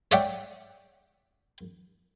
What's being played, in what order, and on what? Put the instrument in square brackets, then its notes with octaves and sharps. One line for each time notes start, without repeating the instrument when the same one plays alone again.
[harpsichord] C#5 D5 E5 F#5 G5